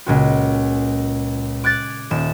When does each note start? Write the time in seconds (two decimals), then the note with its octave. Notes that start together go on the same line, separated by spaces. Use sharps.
0.06 C#2 A#2 F#4
1.64 D6 F#6 G#6 A6
2.11 D#1 E7